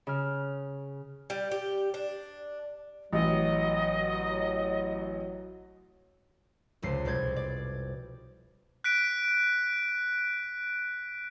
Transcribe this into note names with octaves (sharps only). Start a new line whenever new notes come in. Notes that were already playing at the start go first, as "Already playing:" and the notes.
C#3 F6
G3
G4
D4
A1 F#3 D#5
F1 C#2 C7
C2 B2 D5 G6 G#6
D5
F#6 B6 D7